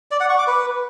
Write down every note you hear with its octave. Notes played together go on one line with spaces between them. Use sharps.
D5
F#5
C#6
D6
B4